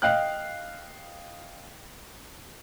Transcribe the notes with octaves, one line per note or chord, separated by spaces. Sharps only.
D#5 F5 G5 F#6